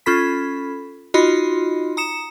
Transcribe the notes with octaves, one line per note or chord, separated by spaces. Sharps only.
C#4 F4 A4 B5 B6
D#4 F4 F#4 D#5 B5 C6
A#5 D#6 C#7 E7